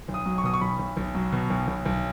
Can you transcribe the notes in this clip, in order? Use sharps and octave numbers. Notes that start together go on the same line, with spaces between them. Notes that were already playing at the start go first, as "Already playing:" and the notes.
B1
D#6
F#3
C#6
B2 D#6
C#6
B1 B5
B1
B1
F#3
B2
B1
B1
B1